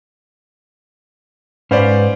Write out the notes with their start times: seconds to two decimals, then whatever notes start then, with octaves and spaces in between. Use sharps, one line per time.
1.71 G#2 C#4 B4 C5 D5 F5